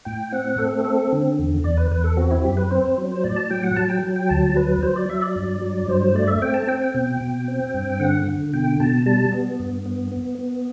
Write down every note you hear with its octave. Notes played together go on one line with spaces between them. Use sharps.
A2 G5
C4 F#5
A3 A4
C4 A4
D3
E2
E2 D5
B4
E2 B4
A4
C4 F#4
E4
F#2 G4
B4
C4 C5
F#3
C5
A2 D5
A5
F#3 G5
F#5
F#3 A5
G5
F#3
G5
D2 A5
F#3 B4
F#3 C5
D5
F#3 E5
D5
G2
F#3
G2 C5
C5
A3 D5
E5
C4 G5
A5
C4 G5
G5
B2
B2
C4
G2
D3 F#5
D3
B2 G5
B2 A5
G3 A5
B3
G2
B3
B3
B3